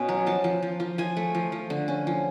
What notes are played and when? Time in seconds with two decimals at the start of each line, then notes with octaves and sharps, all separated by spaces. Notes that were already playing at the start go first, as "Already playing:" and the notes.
Already playing: B2 C#4
0.09 F#3
0.26 F3 A5
0.44 F3
0.63 F3
0.80 F3
0.98 F3 G#5
1.17 A3
1.35 F3
1.52 F3
1.70 D3
1.88 C#4
2.07 F3